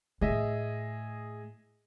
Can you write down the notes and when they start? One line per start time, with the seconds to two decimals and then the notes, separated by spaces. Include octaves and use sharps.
0.21 A2 A3 G#4 D#5 E5